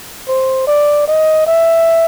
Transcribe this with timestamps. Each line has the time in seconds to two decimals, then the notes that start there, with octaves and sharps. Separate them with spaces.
0.28 C5
0.67 D5
1.08 D#5
1.47 E5